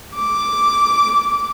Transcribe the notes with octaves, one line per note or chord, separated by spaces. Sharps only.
D6